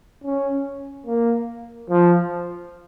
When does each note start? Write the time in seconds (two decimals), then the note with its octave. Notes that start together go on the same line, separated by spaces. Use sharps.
0.24 C#4
1.06 A#3
1.90 F3